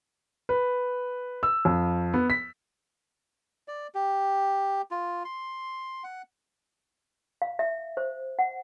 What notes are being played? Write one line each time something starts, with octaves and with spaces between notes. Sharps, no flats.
B4
E6
F2
B3
B6
D5
G4
F4
C6
F#5
F5
E5
C5
F#5